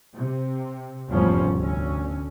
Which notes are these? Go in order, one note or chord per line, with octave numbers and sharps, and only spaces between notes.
C3
F1 E2 G#2 F3 G3 C#4
D2 C#4